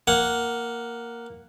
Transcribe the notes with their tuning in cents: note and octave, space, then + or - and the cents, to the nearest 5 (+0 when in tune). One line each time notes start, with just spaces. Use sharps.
A#3 +0 F#5 +0